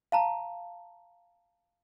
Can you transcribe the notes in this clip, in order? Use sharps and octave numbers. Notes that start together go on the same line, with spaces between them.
F5 A5 A#5